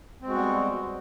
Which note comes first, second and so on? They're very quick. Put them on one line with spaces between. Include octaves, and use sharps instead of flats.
C4 G#3 F#4 B3 G3